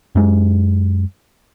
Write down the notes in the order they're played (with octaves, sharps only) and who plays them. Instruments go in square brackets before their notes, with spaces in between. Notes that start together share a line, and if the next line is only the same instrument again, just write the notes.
[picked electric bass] F#2 G#3